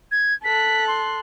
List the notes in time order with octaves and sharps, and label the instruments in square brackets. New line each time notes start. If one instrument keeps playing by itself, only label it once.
[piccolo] G#6
[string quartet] A4 F#6 [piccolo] B6
[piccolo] C6